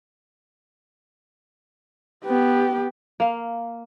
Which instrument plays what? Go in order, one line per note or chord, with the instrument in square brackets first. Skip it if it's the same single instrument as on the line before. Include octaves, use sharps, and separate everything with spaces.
[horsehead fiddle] B3 G4
[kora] A#3 F5